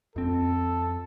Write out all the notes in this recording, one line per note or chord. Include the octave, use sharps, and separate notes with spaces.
F2 C4 A4